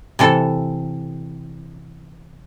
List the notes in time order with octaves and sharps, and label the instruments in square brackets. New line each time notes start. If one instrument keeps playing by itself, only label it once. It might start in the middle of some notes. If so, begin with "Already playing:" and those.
[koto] C3 E3 A4